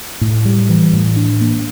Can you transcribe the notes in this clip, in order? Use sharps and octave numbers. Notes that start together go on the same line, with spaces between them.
A2
G3
E3
A2
D4
A#3